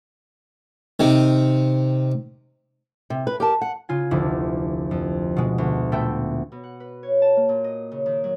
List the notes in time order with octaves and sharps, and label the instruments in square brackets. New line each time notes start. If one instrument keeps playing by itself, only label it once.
[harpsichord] C3 D#3
[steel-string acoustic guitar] C3
B4
G4 A#4 A5
F#5
[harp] C#3 F4 G#5
F1 D2 E4
F2
B2 G#3
D2
A#2 A3 B3 E5 G5
B2
F#5
B4
C#5
A5
A#3
A#2
D#5
C#3
D#3
F#3